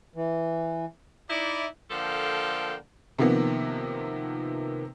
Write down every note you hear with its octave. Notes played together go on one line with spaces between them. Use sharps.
E3
D#4 E4 D5
D3 F3 A#3 A4 F5 G5
C3 D#3 F3 A#3 B3